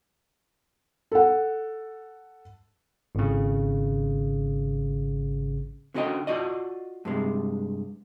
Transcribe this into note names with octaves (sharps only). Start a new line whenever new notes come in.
A4 F#5
G#1 C#3
D3 C#4 F#4 A#4 D#5 G5
F4 F#4 D5 D#5
G2 C3 G#3